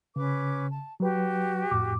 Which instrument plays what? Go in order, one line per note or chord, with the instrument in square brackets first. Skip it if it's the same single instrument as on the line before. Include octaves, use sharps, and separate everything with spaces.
[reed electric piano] C#3 [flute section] C#4 B4 D6
[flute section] A5
[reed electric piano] F#3 B4 [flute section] F#4 G4
[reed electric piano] F2 A2 D6